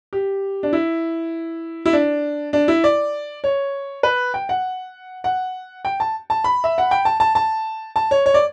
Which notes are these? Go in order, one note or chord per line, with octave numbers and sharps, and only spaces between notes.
G4
D4
E4
E4
D4
D4
E4
D5
C#5
B4
G5
F#5
F#5
G5
A5
A5
B5
E5
F#5
G5
A5
A5
A5
A5
C#5
C#5
D5